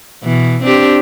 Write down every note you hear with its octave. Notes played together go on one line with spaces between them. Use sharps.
B2 E3
C4 D4 G4